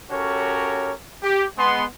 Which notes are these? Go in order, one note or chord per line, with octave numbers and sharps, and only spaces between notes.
C#4 F#4 G4 A4 A#4 C#5
G4
G#3 B3 C6